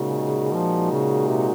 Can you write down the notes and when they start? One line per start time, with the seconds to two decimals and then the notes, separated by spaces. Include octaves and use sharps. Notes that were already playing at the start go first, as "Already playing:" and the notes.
Already playing: A#2 C#3 G#3 D#4 F#4
0.54 F3
0.91 C#3
1.28 C3